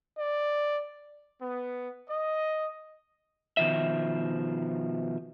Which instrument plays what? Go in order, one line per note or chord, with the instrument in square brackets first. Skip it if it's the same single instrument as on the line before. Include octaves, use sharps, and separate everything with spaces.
[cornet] D5
[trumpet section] B3
D#5
[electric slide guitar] B2 D#3 F3 E5